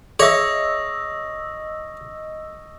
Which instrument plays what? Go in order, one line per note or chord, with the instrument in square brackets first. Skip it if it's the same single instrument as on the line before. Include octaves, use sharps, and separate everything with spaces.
[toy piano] G#4 E5 [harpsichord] C#5 [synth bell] D#5 E6 [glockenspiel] C#6 D#6 A#6